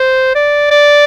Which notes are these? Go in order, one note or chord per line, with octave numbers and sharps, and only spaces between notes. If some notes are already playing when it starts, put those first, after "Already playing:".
Already playing: C5
D5
D5